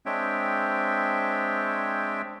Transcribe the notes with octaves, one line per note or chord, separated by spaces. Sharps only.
G#3 C4 D4 C#5 E5 G5